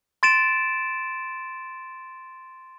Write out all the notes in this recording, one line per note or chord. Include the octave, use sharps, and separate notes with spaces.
C6 A6 D7 E7